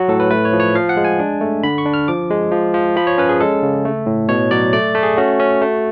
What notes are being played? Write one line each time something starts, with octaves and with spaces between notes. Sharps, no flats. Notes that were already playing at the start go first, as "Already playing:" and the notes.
Already playing: F#3 F#4
A2 A4
B4
A3 B4
C#5
F3
C#5
F3 F5
F#5
G#3
G#5
D4
A3
D3 B5
C#6
D4
F6
F3 D6
G#3
F3
F3
F3 B5
C#5
C#4 B4
G#4
G#3 A4
C#3
A3
A2
B2 C#5
F#3 D5
A3 D5
A3
G#4
C#4 F#4
C#4
A3